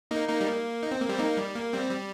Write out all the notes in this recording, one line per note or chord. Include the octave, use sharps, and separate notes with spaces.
A#3 D#4
A#3 D#4
G3
A#3
D#4
C4
A#3
G3 C4
A#3 D#4
G3
A#3
G3 C4
G3